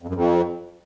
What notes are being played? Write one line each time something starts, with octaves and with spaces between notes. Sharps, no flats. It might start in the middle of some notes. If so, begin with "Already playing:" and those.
F2
F#2
F2